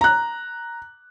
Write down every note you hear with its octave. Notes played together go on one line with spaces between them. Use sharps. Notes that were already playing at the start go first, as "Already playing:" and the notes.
A#5 F#6